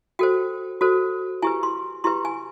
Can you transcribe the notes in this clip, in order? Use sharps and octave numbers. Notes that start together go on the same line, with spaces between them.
F#4 A4 C5 G5
F#4 A4 C5
E4 G4 B4 G#5
C6
E4 G4 B4 C6
G#5